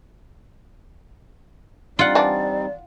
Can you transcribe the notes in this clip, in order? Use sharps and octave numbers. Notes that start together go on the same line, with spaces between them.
G3 C4 D#4 F4 D5 F#5
E3 D4